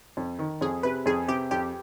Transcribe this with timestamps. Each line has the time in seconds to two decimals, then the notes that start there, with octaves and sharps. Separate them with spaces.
0.17 F2
0.39 D#3
0.61 F2 G#4
0.83 C3 B4
1.06 F2 G#4
1.28 C3 G4
1.51 F2 G4